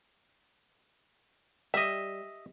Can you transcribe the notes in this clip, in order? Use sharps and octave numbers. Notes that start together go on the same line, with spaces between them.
G3 D#5 E5